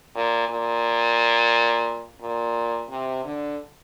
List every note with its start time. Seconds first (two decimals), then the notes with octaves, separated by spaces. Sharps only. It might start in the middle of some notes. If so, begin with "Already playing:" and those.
0.15 A#2
0.49 A#2
2.21 A#2
2.90 C3
3.24 D3